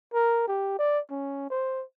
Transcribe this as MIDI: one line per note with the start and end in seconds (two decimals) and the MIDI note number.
0.14 0.44 70
0.48 0.74 67
0.79 0.99 74
1.10 1.48 61
1.50 1.84 72